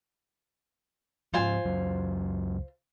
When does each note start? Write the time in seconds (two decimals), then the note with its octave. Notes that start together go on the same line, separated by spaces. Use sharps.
1.34 G#2 F3 F4 C5 G#5
1.65 C#2 F#2 F#3